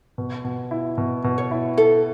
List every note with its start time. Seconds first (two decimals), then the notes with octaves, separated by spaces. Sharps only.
0.18 B2
0.45 B2
0.71 E4
0.98 B2
1.24 B2
1.38 C#5
1.51 E4
1.77 E4 A4